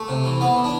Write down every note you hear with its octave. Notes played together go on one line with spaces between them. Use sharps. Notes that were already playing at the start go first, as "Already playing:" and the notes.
Already playing: A3
C3
E3
E3 B3
E3
D4